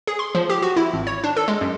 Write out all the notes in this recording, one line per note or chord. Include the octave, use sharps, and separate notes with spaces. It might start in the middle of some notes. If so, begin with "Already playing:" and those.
G#4
C6
F3
G4
F#4
E4
G#1
C#5
D4
A4
G#3
F#2